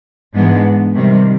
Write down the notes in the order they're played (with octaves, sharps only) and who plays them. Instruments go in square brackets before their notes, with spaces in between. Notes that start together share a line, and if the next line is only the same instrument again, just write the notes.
[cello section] G#2 E3 G#3 B3 D4
C3 D#3 G3